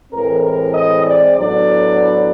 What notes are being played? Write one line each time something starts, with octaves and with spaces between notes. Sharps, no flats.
A2 E3 G#3 C4 A#4
A#4
D#5
D5
A2 F#3 B3 D4 D5